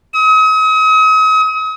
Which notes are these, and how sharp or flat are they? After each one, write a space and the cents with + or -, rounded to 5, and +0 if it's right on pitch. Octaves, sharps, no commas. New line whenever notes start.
D#6 +40